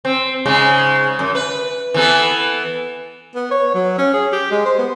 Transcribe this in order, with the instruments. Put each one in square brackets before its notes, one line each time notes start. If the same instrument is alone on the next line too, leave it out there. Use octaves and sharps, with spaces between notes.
[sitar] C4
G#2 C#3 G#3
F#2
B4
E3 B3 A4
[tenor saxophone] B3
C#5
F#3
C#4
G#4
G4
G#3
C5
B3